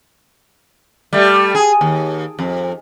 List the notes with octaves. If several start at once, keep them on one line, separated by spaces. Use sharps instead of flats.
G3 A3
G#4
D#2
F2